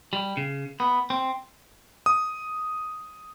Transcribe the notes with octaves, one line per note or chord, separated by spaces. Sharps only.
G3
C#3
B3
C4
D#6